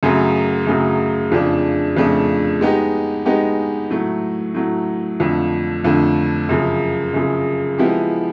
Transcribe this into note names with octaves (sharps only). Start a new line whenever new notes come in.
F#2 C#3 F#3 A3
F#2 C#3 F#3 A3
F2 C#3 F3 A3 D4
F2 C#3 F3 A3 D4
G#3 B3 D#4 G4
G#3 B3 D#4 G4
A2 F#3 A3
A2 F#3 A3
F2 D3 F3 A3
F2 D3 F3 A3
F#2 C#3 F3
F#2 C#3 F3
F3 G#3 B3 E4 G4